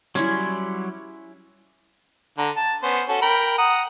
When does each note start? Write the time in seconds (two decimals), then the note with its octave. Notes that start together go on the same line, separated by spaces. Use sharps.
0.15 F#3 G3 C#4 E4 C6
2.38 D3 A#5
2.56 A5
2.83 B3 C#4 C5
3.09 C#4 F#4 A4
3.22 A#4 G5 B5
3.58 F#5 A#5 D#6